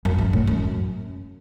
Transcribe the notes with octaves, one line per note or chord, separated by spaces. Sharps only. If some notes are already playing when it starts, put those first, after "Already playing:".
F#2
F#2
A2
F#2